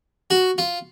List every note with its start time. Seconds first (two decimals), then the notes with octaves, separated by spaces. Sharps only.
0.30 F#4
0.58 F4